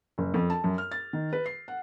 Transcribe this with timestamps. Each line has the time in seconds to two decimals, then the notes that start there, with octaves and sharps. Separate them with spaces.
0.18 F#1
0.34 F2
0.50 A5
0.64 F#2
0.78 F6
0.92 A6
1.13 D#3
1.33 B4
1.46 C7
1.68 F#5